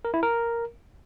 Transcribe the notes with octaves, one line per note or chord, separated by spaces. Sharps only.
A#4
E4
A#4